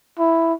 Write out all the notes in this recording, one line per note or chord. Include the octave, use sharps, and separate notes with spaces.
E4